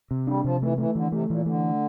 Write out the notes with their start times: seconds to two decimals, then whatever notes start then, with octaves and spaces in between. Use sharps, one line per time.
0.11 C3
0.27 G3 D4
0.44 C3 F3
0.62 E3 A3
0.78 E3 A3
0.95 D3 E3
1.12 C3 A3
1.30 A#2 E3
1.46 D3 A3